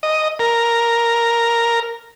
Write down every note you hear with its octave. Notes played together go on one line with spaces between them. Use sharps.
D#5
A#4